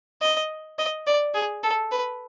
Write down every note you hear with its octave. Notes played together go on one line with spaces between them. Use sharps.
D#5
D#5
D5
G#4
A4
B4